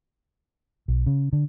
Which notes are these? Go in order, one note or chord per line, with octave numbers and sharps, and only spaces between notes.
B1
C#3
D3